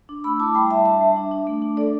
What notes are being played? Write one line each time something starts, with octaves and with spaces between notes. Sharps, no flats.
D4
A3 B5 E6
E4 A5 D6
G3 G5 B5
G3 E5 A5
D4 E5 A5
G3
D4
D4
A3
D4
D4 A4 D5